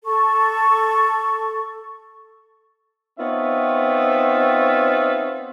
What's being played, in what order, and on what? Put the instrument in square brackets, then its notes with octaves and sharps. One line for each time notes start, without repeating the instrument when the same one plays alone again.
[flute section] A4 C#6
[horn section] B3 C4 D#4 F4 C#5 E5